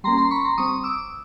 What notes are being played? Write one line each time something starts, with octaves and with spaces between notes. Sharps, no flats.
G3 A#3 C#4 A#5 C6
A#5 C6
B5 C#6
A#5 C6
G3 C4 C#6 D#6
D6 E6